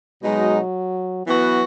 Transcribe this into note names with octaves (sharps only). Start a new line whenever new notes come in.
B2 F#3 G#3 D#4
E3 F#3 B3 F#4